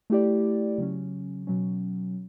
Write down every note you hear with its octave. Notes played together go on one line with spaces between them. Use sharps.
A3 E4 G4 D5
C#3 F#3 C#4
B2 F#3 C#4